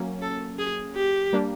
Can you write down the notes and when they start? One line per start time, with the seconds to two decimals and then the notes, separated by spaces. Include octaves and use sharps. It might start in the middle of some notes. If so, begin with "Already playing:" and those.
Already playing: F#3 A#3 C#4
0.22 A4
0.59 G#4
0.95 G4
1.33 G3 A#3 D4